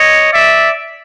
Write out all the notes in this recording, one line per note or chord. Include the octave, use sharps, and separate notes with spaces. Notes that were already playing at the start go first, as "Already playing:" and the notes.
Already playing: C#5 D#5
D5 E5